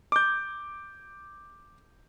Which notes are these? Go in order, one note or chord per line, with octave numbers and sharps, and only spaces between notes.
D6 G6